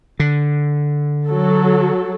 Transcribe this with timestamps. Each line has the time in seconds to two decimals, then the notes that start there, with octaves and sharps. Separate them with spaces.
0.20 D3
1.27 F#3 A4